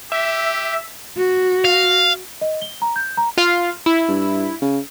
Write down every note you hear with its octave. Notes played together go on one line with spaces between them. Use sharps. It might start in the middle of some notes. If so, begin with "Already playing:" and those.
G4 E5
F#4
F5
D#5
G7
A#5
G6
A#5
F4 F5
E4
G2
C#3